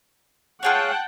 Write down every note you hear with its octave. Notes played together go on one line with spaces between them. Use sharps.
F4 G#4 C#5 F#5 G5 A5